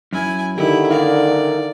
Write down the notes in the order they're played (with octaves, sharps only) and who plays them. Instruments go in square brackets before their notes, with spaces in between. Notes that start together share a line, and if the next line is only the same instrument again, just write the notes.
[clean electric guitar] F#2 [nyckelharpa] E4 G#5
[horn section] D3 D#3 [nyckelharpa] E4 [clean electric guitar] G4
[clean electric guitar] E4 A#4 F5 [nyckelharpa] D5